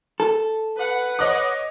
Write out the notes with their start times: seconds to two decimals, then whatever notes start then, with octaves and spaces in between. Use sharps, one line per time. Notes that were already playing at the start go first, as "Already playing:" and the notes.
0.20 A4
0.77 B4 F#5
1.19 C#5 D#5 D6